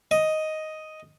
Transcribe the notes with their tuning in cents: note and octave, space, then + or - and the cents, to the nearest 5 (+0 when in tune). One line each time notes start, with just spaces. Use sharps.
D#5 +5